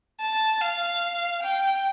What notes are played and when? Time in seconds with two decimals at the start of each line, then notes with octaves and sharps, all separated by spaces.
0.22 A5
0.61 F5
1.43 G5